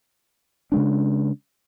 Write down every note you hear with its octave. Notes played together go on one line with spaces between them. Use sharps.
C#3 G#3 D4